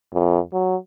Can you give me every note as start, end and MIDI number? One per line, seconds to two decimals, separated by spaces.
0.13 0.39 41
0.53 0.76 54